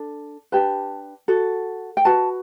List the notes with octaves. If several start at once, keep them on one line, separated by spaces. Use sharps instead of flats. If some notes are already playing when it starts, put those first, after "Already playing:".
Already playing: D4 A4
D4 G4 B4 A5
F#4 A4
G5
F#4 B4 A5